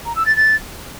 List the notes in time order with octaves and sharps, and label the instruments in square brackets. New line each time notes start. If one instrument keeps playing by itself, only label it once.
[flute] A#5
E6
A6
A6